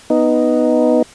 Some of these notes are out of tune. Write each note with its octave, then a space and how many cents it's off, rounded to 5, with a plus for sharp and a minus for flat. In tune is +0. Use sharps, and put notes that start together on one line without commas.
B3 +0 D#4 +0